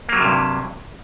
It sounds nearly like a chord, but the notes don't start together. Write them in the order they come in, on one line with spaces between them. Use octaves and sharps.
A#3 F#3 G3 C3 G2